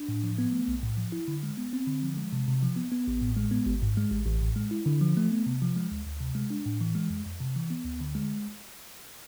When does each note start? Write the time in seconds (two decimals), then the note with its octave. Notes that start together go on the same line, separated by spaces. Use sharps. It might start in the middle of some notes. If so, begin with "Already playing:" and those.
Already playing: D4
0.09 A2
0.23 F3
0.38 B3
0.52 A3
0.68 B1
0.83 A2
0.97 F3
1.12 E4
1.28 D3
1.43 G#3
1.57 B3
1.73 C4
1.87 D3
2.02 F3
2.17 G#3
2.33 C3
2.48 C3
2.63 F3
2.76 B3
2.92 B3
3.08 A1
3.21 A2
3.37 G#3
3.51 B3
3.66 G#1
3.82 G#2
3.97 G#3
4.11 A1
4.26 A1
4.41 A2
4.56 G#3
4.71 E4
4.86 D3
5.01 F3
5.17 A3
5.31 B3
5.46 C3
5.62 F3
5.76 G#3
5.91 D2
6.06 D2
6.20 C3
6.35 G#3
6.50 D4
6.66 A2
6.81 E3
6.95 G#3
7.10 F2
7.26 F2
7.40 C3
7.56 E3
7.70 B3
7.85 D2
8.01 D3
8.15 G#3